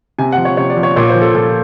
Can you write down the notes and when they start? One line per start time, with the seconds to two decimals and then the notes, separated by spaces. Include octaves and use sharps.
0.19 C3 G#5
0.32 F#5
0.38 F3
0.45 C#5
0.57 C3 C#5
0.70 D5
0.77 F3
0.83 C#5
0.96 A#2 C#5
1.09 C5
1.15 F3
1.21 A4
1.35 A#2 A4